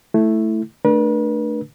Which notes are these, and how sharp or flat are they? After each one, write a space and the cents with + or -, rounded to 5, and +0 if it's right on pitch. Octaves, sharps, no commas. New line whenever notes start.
A3 +0 E4 +0
A3 +0 D4 +15 B4 -45